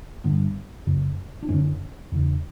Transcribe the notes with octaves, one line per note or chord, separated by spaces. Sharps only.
G2 D3 B3
F#2 C#3
D4
F#2 D3 C#4
E2 C#3